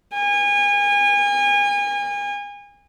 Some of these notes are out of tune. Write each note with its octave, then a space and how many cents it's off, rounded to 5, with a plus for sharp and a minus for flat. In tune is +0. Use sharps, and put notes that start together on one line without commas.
G#5 -35